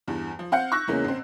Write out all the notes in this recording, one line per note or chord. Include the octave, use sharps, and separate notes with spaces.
E2 G2 E3
F3
C4 F5 F#5 G6 C#7
C#6 E6 F#6 A#6
E2 C#3 E3 G#3 A#3 C#4
A1 C4